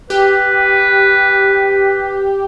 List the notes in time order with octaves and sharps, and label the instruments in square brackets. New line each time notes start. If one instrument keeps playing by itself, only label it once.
[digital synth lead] G4 [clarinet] B4